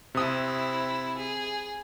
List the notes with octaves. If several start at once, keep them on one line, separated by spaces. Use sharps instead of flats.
C3 C4 E4 D#6
G#4